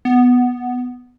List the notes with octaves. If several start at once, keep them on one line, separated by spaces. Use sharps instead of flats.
B3